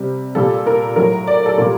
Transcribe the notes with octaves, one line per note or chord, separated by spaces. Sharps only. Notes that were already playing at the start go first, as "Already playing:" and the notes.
Already playing: C3 G3
A#2 G3 A4
A#4
A2 F#3 A#4
D5
A4
A#2 G3 A#4